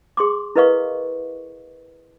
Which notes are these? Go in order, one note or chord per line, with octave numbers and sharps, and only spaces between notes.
G#4 C6 D6
E4 A#4 B4 D#5 F5 C#6